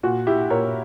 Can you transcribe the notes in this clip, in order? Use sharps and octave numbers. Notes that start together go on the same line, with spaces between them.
A#2 F#4
E4 G4
A#2 A#4 C#5